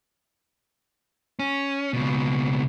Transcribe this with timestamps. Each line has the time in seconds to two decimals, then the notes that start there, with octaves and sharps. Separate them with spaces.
1.39 C#4
1.93 C#2 B2